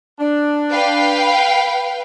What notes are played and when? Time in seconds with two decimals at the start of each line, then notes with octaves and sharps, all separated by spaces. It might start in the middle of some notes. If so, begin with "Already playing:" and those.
0.19 D4
0.71 B4 F5 G5